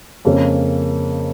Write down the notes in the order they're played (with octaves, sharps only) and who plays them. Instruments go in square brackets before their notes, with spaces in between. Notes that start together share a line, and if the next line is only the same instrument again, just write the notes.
[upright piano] F2 C#3 A#3 C#4